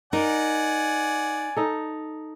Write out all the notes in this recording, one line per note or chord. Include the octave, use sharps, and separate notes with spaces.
D#4 A#4 D5 F#5 G#5
D#4 A4